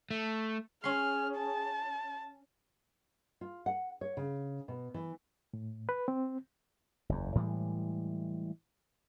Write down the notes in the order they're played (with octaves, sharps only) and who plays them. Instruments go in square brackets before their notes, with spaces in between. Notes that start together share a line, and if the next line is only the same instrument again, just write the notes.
[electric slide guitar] A3
[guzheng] C#4 C6 [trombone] G#4 [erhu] F6
[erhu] A5
[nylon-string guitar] F4
F#5
C#5
C#3
B2
E3
[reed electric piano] A2
B4
C4
[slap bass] F#1 E2
A2 E3 G3 G#3